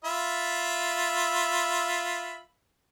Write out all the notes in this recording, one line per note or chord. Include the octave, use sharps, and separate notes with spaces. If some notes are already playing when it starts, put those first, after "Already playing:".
F4 E5 B5